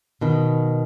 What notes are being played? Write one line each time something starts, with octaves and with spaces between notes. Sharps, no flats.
B2 D#3